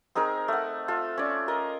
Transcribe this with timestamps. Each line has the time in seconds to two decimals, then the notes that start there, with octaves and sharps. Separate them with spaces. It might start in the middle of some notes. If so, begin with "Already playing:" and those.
0.15 C4 D#4 G#4 A#4
0.48 A3 F#5
0.88 F4 A4
1.18 C#4 D5
1.48 A#4 D#5